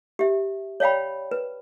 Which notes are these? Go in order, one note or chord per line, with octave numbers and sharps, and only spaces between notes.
G4 E5
C#5 D5 F5 G5 B5
B4